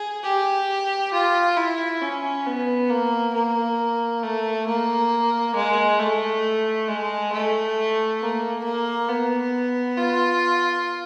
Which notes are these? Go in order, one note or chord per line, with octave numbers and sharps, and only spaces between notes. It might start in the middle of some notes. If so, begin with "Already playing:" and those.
Already playing: G#4
G4
F4
E4
C#4
B3
A#3
A#3
A3
A#3
G#3
A3
G#3
A3
A#3
A#3
B3
F4